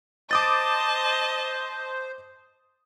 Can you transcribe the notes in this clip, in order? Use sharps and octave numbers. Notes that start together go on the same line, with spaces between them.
C5 D#5 A5 D6 D#6 A6